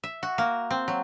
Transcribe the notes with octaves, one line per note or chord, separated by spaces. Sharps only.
E5
F#4
A#3
C4
F#3